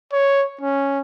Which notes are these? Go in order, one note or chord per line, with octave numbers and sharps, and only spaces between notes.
C#5
C#4